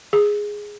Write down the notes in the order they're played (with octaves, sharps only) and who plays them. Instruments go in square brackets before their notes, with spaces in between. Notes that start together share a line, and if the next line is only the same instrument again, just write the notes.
[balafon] G#4